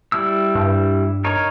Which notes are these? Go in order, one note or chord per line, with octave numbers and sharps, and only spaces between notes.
G3 E4 E6
G2
D#4 A#4 C#5